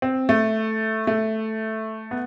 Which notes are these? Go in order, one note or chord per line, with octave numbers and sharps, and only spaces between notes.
C4
A3
A3
B3